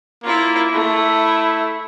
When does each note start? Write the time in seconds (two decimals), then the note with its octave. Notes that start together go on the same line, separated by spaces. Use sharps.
0.24 A#3 E4 F4
0.73 A3 E4